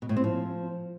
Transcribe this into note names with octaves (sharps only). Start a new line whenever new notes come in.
B2
A2
C4
F3